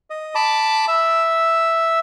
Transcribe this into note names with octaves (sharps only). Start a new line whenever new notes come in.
D#5
A5 B5 D6
E5